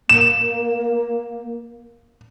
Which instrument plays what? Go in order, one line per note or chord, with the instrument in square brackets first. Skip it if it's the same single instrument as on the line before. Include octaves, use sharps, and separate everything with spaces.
[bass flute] A#3 [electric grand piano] E7